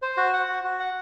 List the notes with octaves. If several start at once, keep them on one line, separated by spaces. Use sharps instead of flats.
C5
F#4
F#5
F#4
F#4
F#5